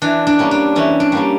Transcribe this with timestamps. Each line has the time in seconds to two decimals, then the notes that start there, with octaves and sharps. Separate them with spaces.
0.02 E3 D4
0.27 D4
0.39 G3 A#3 C#4
0.51 D4
0.76 E3 C#4
1.00 D4
1.12 G3 A#3 C#4